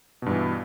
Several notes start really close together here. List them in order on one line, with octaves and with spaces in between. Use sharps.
B2 G2 E3